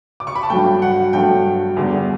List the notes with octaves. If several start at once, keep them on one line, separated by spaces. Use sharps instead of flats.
D6
C#6
B5
A5
G2 F#3 A3 G5
F#5
G2 F#3 A3 G5
E2 D3 G3